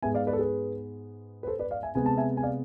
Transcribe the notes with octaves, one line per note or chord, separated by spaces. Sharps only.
G#2 G#3 B3 E5 G#5
D5 F5
B4 D5
A4
G#4 B4
B4
A4 C5
B4 D5
D5 F5
E5 G#5
C3 G#3 B3 G#5
A5
E5 G#5
G#5
D5 F5